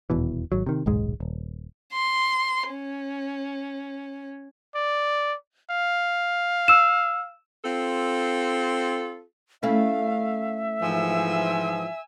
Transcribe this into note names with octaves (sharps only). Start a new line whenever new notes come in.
D#1 E2 B2 E3
G#1 F#3
C3 D#3
D#1 B1 G#2 G#3
D#1
C6
C#4
D5
F5
E6 E7
C4 F4 A4
A3 C#4 E4 E5 F5
G#2 E3 F3 G#5 E6